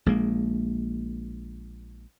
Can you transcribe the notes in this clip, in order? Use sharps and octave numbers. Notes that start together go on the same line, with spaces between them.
A#1 G#3 A#3